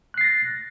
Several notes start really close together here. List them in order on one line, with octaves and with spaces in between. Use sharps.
F#6 C7 A6 A#6